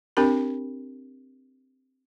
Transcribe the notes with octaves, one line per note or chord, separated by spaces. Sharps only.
C4 D4 G4 A#4 B5